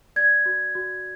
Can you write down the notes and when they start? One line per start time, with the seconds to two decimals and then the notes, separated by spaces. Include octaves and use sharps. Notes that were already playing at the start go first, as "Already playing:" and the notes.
0.16 D5 G#6
0.46 F#4
0.75 F#4